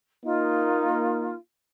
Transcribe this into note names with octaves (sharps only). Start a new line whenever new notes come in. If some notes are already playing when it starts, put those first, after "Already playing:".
A#3 D#4 F4